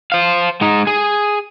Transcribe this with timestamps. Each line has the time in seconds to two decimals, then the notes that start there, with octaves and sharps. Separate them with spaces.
0.12 C5 F5
0.61 G#3 D#4
0.87 G#4